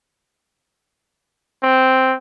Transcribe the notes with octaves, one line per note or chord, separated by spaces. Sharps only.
C4